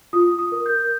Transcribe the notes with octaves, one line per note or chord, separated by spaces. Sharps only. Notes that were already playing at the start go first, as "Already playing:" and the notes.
F4 D#6
D#6
A#4
G6